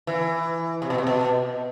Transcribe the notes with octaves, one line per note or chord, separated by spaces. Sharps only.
E3
C3
B2
C3
B2